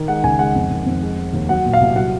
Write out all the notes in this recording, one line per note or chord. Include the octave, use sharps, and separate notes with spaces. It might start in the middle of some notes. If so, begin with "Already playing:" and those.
Already playing: D#3
G#3 F#5
C#2 G#5
G#3 F#5
F2
D#3
F2
G#3
G#3
D#2
F#3 F#5
A#2
F5
C2
F#3 F#5